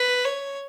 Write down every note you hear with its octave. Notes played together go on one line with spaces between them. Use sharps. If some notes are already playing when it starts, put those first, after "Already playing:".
Already playing: B4
C#5